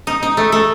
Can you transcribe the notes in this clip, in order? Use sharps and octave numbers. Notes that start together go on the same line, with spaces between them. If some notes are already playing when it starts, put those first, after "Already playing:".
D#4
D#4
A3
A3